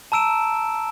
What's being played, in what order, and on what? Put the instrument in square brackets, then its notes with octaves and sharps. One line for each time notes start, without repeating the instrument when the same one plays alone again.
[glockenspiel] A5 A#5 E6 D7 E7